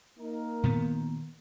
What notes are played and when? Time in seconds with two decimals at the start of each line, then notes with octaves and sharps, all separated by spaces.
0.19 A#3 D#4 A#4
0.63 A#2 D#3 B3